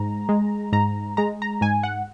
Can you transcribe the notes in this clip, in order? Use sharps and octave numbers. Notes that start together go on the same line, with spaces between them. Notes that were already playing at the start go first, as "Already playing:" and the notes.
Already playing: G#2 A#5
G#3
G#2 A#5
G#3 A#5
A#5
G#2 G#5
F#5